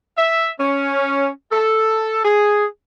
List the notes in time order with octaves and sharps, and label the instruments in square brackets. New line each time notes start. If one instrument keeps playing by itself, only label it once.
[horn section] E5
C#4
A4
G#4